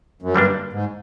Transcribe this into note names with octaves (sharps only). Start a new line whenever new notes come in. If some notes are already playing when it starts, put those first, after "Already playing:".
F#2
G2 D3 G3 A#3 D4
G#2